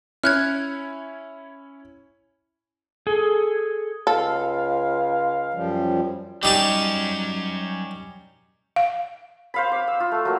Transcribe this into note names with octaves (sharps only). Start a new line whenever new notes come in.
C#4 E4 C#5 F6 F#6 G#6
G#4 A4
C#2 A4 F5
F#2 F3 G3
F#3 G3 C#4 D#4 A5
F5
C5 F5 B5
F5 D6
E6
F4
A3
F#3 A#3